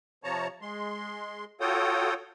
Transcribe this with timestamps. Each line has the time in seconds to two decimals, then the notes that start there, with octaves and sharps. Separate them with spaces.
0.24 C3 F3 C#5 A5 A#5
0.62 G#3 C6
1.61 F4 F#4 A4 C#5 G5 D#6